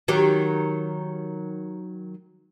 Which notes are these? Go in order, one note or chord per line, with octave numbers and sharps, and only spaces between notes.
D#3 F#3 G4